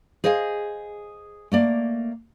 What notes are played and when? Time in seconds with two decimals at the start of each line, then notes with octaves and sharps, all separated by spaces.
0.24 G#4 C5 D#5 F5 G5 G#5
1.52 A3 A#3 D5